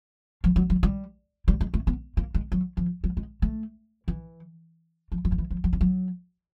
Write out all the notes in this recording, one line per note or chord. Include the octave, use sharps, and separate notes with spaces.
F3
F#3
F#3
G3
G3
G#3
A3
B3
A#3
G#3
F#3
F3
F#3
G#3
A3
E3
F3
F#3
F3
E3
F3
F#3
G3
F#3